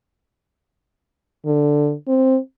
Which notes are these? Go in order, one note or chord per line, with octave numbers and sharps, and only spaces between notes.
D3
C4